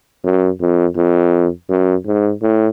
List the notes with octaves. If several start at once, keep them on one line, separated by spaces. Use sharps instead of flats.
F#2
F2
F2
F#2
G#2
A2